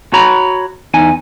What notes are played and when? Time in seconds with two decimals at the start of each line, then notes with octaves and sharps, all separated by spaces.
0.13 F#4 C#5 A#5 B5
0.94 E2 D#4 G#5